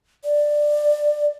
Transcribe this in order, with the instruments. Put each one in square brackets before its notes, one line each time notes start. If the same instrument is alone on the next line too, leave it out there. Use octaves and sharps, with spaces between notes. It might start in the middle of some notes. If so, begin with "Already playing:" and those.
[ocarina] D5